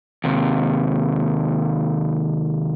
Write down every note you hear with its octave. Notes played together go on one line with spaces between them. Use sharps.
D#2 C3